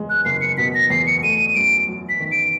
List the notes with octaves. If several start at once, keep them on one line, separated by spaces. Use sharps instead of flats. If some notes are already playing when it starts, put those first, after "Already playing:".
Already playing: F#1 E2 G#3
F#6
F#1 C7
C#7
B2 B6
A#6
E2 C7
C#7
A3 D#7
F#2 D7
F#3
B6
D#3
D7